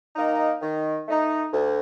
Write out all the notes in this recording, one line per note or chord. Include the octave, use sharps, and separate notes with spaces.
D#3 A#3 D#4
D#3
A3 D#4
D2